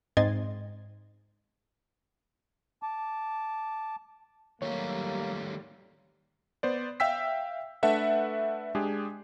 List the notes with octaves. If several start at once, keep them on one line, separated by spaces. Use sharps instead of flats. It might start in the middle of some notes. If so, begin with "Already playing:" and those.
G#2 C4 D#5 C6 G#6 A6
A5 D6
D#3 F#3 G3 A3 A#3 G4 C#5
B3 C5 D5
E5 F5 G5 E6 B6
A3 D4 A4 B4 E5 F#5
G#3 D4 G4 G#4